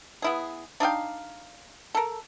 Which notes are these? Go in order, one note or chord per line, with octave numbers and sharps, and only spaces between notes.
B3 E4 G#4
D4 D#4 F5 G5
A4 A#4